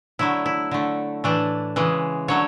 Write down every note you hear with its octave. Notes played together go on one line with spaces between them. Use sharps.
D3 F#3 A3 E4
E4
D3 A3
A2 E3 A3 D4
C#3 E3 G#3
D3 F#3 A3 C#5